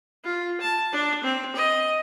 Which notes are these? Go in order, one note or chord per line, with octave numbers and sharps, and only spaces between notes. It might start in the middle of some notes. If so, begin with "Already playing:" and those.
F4
A5
D4
C4
D#5